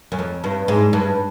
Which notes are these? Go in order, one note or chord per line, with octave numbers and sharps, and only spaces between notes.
F#2
F2
G2
G#2
G2